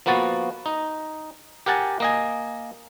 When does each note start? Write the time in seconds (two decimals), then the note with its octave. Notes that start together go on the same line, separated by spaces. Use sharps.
0.06 F3 A#3 B3 F#4 A5
0.66 D#4
1.66 G4 A#4 F#5 G#5 A5
2.00 A#3 D#5 G#5